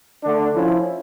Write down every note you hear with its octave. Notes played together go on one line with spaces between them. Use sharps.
D3 A3 D4
F3 C#4 E4